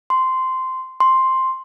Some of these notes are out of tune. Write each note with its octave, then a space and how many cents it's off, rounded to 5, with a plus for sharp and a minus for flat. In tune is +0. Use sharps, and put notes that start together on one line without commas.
C6 -10
C6 +5